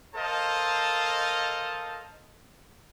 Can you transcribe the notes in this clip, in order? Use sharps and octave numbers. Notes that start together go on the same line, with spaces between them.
A4 A#4 C5 D#5 F5 A5